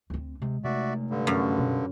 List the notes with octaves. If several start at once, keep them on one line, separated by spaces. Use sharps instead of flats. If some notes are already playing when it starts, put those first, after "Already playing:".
D2 C4
C3 G#3
C3 A3 F#4 D5 E5
G2 D3
F#2
B2